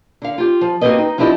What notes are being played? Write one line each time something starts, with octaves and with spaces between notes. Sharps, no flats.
D3 F5
F4 G4
F3
A#3 C4 F#4 G4 B4 D#5
D#4
F3 B3 D4 E4 G4 D#5